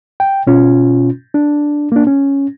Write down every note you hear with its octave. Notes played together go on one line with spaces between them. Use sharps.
G5
B2 C#4 F4
D4
A#3 D4
C#4